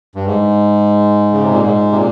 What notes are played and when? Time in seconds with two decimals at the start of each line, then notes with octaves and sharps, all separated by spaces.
0.15 G2
0.26 G#2
1.32 C#3
1.42 C3
1.52 A#2
1.62 G#2
1.92 C3
1.96 A#2